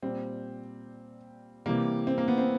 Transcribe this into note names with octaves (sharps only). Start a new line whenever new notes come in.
A#2 G3 C4
C3 E3 G3 A#3
C4
A#3
B3
C4